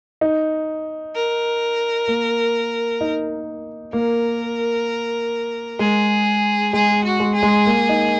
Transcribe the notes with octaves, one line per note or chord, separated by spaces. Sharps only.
D#4
A#4
A#3
D#4
A#3 A#4
G#3 G#4
G#3 G#4
F#4
G#3
G#4
G#3
A#3
D#4